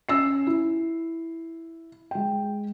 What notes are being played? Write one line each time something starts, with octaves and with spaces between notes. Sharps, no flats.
C#4 E6 C7
E4
G#3 G5